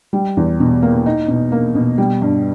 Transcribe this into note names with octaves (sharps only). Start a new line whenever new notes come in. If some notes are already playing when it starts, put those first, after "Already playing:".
G3
E2
B2
A#3
D#4
B2
A#3
B2
G3
G2